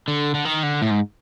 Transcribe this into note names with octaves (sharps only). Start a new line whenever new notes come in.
D3
D3
D#3
D3
A2
G#2